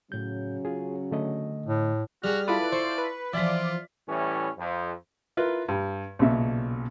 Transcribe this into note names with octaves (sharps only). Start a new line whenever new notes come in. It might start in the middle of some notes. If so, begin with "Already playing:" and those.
A2 C#3 F#3 C#4 G6
F4 G#4
D3 A3 D#5
A2
G3 F#4 G#4 F6
E4 F4 A4 B4 D5
C5 C#6
B4
E3 F3 F4 D5 E5 B6
A2 E3 G3 C#4
F2
E4 F4 A#4 B4
G2
B1 A#2 C#3 E5